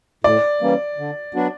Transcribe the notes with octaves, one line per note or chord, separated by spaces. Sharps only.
A2 D5
E3 G3 A#3 C#4
D3
F#3 B3 D4 F#4